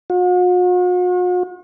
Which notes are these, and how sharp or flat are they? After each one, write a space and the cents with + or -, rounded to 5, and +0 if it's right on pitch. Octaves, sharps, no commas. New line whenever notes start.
F#4 -45